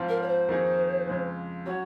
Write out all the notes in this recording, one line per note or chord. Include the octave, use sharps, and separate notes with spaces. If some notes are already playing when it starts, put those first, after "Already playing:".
Already playing: G#2 F3 C4 F4
A#4
C#5
C5
F2 D#3 A#3 D#4 G#4
F2 C#3 G#3
F#3 C#4 F#4 C#5